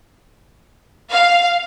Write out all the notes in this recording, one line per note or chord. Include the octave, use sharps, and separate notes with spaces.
F5